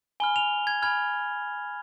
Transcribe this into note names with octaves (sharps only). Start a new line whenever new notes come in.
G#5 B5 F6 G7
F7
G#6
G#5 B5 F6 G#6